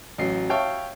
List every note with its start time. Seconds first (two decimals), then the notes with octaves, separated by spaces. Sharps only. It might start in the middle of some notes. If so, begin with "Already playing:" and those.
0.18 A1 F#3 C7
0.49 C#5 E5 F5 G5 A5 C#6